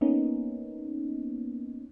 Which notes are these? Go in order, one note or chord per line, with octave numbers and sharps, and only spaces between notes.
A#3 B3 C#4 D#4